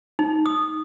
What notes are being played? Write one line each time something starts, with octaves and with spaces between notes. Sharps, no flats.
D#4
D#6